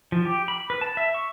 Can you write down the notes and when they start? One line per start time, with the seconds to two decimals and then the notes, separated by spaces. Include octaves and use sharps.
0.12 F3
0.25 G4
0.48 B5
0.70 B4
0.81 A5
0.97 E5
1.14 C#6